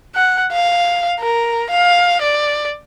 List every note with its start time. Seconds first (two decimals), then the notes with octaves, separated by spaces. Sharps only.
0.15 F#5
0.53 F5
1.20 A#4
1.70 F5
2.22 D5